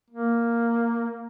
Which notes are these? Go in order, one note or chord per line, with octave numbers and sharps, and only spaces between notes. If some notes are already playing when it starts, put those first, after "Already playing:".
A#3